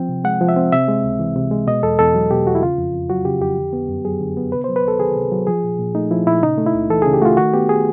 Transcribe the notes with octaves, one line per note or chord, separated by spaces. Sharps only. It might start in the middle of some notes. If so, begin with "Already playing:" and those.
Already playing: F3 C4 G5
C3
G#3 F#5
F3
E5
C4
C3 E5
G#3
C#2
E3
C3
G#3
B2 D#5
E2 A4
E2 A4
F#3
B2 G4
E2 F#4
E4
C#3 F4
F2
F2
F#3 F#4
C#3 G4
F2 G4
D3
B3
F#2
F#3 G#4
D3
B3
C3 B4
C5
F#3
B4
C#2 A4
D#3 G#4
C3
F#3
F3 G#4
A#2
A#2
A3 D#4
F3 E4
A#2 E4
C#3 D#4
A3
E4
C#2
E3 A4
G#4
C#3
G4
A3 F4 F#4
D#3 F#4
B3 G4
G#4